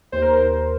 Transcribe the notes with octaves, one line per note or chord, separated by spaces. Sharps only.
D#2 C5
A#4
D#2 C5